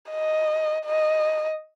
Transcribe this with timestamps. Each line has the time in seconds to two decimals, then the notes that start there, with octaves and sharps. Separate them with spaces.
0.10 D#5
0.86 D#5